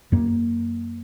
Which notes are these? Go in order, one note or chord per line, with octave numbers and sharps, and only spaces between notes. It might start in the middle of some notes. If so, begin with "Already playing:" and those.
F#2 A#3